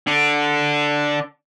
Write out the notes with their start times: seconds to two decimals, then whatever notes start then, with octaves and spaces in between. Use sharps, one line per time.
0.07 D3 D4